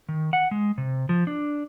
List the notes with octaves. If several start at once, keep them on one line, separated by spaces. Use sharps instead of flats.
D#3
F#5
G#3
C3
F3
D4